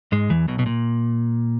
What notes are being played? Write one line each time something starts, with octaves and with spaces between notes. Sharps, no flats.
G#2 G#3
E2 E3
B1 B2
B2
A#2